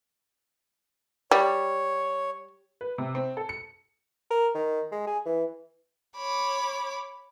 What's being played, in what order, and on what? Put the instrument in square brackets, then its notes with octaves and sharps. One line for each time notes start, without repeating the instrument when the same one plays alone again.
[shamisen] G3 [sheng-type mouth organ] C#5
[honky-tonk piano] B4
C3
C4
A4
C#7
[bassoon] A#4
D#3
G#3
G#4
E3
[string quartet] C#5 B5 D6